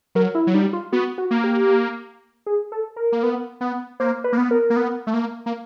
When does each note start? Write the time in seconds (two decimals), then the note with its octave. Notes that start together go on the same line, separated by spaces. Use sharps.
0.15 F#3 A#4
0.35 E4
0.47 F#3
0.54 G3 D#4
0.73 F4
0.92 B3 F#4
1.18 F#4
1.31 A#3
1.44 G4
2.46 G#4
2.72 A4
2.96 A#4
3.12 A#3
3.23 B3
3.61 B3
4.00 A#3 C5
4.24 B4
4.32 A#3
4.38 B3
4.51 A#4
4.70 A#3
4.76 B3
5.07 A3
5.14 A#3
5.46 A#3